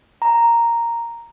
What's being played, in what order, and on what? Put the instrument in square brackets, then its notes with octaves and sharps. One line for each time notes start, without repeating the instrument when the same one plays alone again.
[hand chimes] A#5